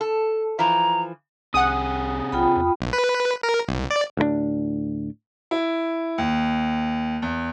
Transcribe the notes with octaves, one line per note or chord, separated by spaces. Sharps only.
A4
E3 F3 A#5
C2 C3 G#4 F#5 D#6
B1 F4 G5 B5
E2
B1
B4
A#4
C2
D5
D2 A2 G#3 D4
E4
D#2
E2